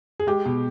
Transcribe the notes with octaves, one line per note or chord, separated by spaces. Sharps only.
G#4
G#3 G4
B2